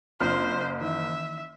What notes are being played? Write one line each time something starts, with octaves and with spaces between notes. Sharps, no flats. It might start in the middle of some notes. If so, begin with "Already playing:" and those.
F#1 C4 D4 F4 C5 F6
D#3 E3 E5